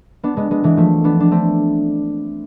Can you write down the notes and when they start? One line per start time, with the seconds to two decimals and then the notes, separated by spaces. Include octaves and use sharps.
0.23 B3 D4
0.37 G#3 B3
0.51 G#3 B3
0.64 E3 G#3
0.77 F3 A3
1.04 B3 D4
1.20 D4
1.31 A3 C4